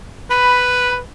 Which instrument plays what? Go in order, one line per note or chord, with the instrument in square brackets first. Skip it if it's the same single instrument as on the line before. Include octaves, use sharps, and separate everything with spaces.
[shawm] B4 [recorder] B5